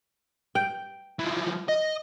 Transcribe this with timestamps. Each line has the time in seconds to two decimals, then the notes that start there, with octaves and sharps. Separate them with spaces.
0.55 G5
1.19 E3 F3
1.69 D#5